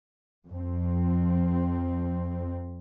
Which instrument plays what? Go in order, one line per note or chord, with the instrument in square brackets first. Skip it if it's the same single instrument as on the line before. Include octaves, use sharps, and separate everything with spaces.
[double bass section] F2 C4